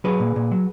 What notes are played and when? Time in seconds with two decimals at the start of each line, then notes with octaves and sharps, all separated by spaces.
0.04 F#3 G#4 B4
0.20 A#2
0.36 A#2
0.51 F#3